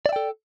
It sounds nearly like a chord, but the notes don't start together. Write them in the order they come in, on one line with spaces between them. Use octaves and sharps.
D5 E5 G5 A4